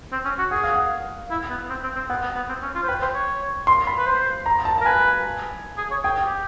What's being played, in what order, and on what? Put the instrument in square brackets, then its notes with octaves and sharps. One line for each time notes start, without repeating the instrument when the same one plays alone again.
[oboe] C4
C#4
F#4
[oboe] G#4 [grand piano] F#5
[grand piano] F5
F#5
[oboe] E4
B3
C4
C4
C4
[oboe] B3 [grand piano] F#5
[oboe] B3
B3
C4
C#4
F4
C5
[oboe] B4 [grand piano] G5
[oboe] C5
C#5
[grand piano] C6
B5
[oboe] B4
C5
[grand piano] A#5
A5
A5
[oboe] A#4
[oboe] B4 [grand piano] G#5
[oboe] G#4
C#5
[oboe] G#4 [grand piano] G5
[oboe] G4